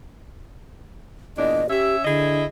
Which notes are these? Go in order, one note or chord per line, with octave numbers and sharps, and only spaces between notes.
E2 A#2 D4 D#5
C#4 G4 E5
D3 E4 G#4 D#5